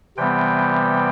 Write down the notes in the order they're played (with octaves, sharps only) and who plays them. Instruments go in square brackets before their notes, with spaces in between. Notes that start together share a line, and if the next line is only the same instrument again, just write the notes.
[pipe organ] C3 E3 G3 B3 G5